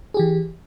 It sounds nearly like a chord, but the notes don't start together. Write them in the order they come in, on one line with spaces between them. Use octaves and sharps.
G#4 G4 E3